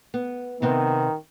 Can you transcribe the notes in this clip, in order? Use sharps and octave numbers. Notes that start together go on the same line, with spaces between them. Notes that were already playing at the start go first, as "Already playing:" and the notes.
B3
C3 D#3 B3 C4